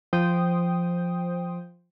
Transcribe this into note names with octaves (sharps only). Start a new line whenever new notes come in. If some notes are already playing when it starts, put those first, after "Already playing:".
F3 C5 G5 D#6